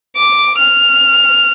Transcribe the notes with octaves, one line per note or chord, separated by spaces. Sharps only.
D6
F6